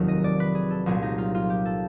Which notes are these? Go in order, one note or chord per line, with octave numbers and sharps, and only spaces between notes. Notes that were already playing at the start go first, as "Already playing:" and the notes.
Already playing: F1 D#2 F#3
D#5
D5
B4
G#4
A4
C2 A#2 F#3 G#4
D#4
F4
F4
G4
A4